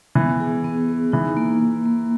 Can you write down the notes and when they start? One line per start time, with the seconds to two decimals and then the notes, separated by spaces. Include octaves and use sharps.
0.15 E3 B3
0.40 G#4
0.65 B3
0.88 G#4
1.12 E3 D#4
1.37 A#3
1.61 A#3
1.86 A#3